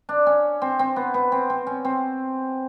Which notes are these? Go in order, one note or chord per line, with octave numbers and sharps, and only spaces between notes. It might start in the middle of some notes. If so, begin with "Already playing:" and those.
D4
C#4
C4
C4
B3
B3
C4
C4
C#4
C4